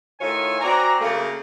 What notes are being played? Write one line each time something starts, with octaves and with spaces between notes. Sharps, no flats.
A2 D#3 F4 C#5 E5 G#5
C4 F#4 D5 G#5 A#5
C#3 F#3 A3 A#3